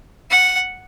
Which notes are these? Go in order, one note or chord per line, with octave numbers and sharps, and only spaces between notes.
F#5